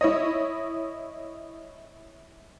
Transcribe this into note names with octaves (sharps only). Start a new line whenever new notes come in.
E4 C#5 D#5